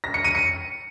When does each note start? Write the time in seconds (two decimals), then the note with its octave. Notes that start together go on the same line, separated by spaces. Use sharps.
0.04 A#6
0.14 C#7
0.24 D#7
0.35 C#7